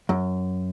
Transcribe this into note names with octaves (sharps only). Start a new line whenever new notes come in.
F#2